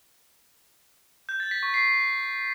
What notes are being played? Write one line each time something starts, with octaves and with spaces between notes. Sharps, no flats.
G6
A6
B6
C#6
C7